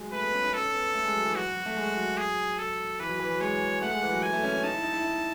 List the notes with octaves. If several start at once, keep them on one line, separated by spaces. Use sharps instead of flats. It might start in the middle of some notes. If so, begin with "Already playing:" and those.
Already playing: F#3 G#3
A3 B4
B3
C#4
D#4
C#4 A4
B3
A3
G#3
F#3
E3
F#3 F#4
F#3
A3
G#3
F#3
G#4
A4
E3 B4
F#3
E3
F#3
G#3 C#5
A3 F#5
G#3
E3
F#3
F#3 G#5
A3
C#4
C#4
D#4 A5
E4
D#4
E4
D#4